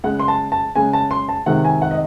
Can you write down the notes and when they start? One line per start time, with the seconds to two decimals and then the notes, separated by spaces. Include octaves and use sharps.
0.04 C#3 G#3 F#5
0.19 C6
0.28 A5
0.52 A5
0.75 C#3 G#3 G#5
0.93 A5
1.11 C6
1.29 A5
1.46 C3 D#3 G#3 F#5
1.65 G#5
1.82 F#5
1.91 D#5